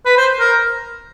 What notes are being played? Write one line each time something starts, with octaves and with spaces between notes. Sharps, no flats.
B4
C5
A#4